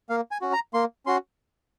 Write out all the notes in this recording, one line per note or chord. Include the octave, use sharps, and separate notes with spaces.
A#3 F5
G#5
C#4 F#4
A#5
A#3 C6
C#4 F#4 C6